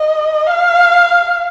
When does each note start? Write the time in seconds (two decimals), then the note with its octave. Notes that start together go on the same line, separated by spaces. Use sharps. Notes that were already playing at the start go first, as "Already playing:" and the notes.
Already playing: D#5
0.46 F5